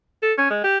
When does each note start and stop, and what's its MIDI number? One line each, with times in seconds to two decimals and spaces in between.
0.22 0.33 69
0.38 0.50 61
0.50 0.61 56
0.64 0.78 67